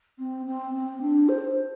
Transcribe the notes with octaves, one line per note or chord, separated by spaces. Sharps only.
C4
C4
C4
D4
C5